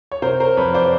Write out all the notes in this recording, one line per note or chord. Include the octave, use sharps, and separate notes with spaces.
C#5
C3 A#4 C5
A#4 C5
F2 B4 C#5
C5 D5